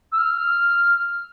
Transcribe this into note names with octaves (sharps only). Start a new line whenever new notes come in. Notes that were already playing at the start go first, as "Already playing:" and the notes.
E6
F6